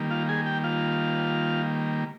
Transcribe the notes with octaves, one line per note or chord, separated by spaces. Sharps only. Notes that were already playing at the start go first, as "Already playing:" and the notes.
Already playing: D#3 G3 A#3
F4 F5
G#4 G#5
G4 G5
F4 F5